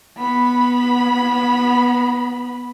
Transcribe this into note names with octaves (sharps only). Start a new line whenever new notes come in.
B3 B5